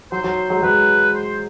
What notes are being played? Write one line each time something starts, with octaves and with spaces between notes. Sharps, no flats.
F#3 C5
F#3
F#3 G#3
F#3 G#3 B4
C5